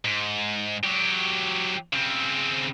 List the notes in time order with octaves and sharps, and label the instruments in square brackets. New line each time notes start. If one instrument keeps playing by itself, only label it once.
[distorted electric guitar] G#2
F#3 G4
C#3 C4